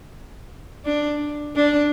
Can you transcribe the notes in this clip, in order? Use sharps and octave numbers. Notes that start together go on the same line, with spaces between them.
D4
D4